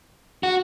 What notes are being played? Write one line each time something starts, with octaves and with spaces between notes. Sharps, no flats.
F#4